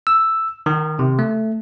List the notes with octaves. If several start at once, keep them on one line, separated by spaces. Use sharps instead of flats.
E6
D#3
C3
A3